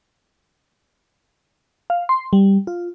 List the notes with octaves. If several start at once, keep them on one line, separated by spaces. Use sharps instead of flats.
F5
C6
G3
F4